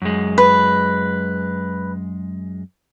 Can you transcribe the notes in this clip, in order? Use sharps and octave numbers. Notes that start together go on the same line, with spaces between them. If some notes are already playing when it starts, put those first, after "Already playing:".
F#2 G#3
B4